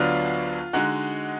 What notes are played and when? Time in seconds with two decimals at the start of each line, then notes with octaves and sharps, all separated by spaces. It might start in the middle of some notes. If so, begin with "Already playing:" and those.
Already playing: D2 D3 F#3 B3 D4 F4 F5
0.73 D3 G#3 D#4 F#4 F#5